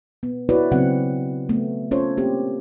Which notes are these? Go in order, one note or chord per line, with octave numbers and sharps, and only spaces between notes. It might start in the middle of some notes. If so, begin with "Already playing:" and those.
B3
E4 F#4 B4 C#5 D5
C#3 F#3 B3 C4 F#5
A3 B3
C#4 F4 A4 C5 C#5
A#3 C4 G4